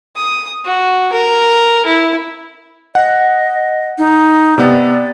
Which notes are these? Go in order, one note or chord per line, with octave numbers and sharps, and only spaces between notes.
D#6
F#4
A#4
E4
D#5 F#5
D#4
C3 B3 D5